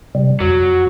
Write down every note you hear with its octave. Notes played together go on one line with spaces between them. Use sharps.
C3 G3
F2 F#3